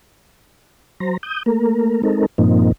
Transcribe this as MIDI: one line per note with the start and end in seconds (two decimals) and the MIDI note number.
1.00 1.17 54
1.00 1.17 72
1.00 1.17 82
1.23 1.43 87
1.23 1.43 91
1.46 2.02 57
1.46 2.02 58
1.46 2.02 70
2.03 2.26 56
2.03 2.26 60
2.03 2.26 63
2.03 2.26 69
2.03 2.26 70
2.38 2.72 43
2.38 2.72 46
2.38 2.72 53
2.38 2.72 58
2.38 2.72 60
2.38 2.72 63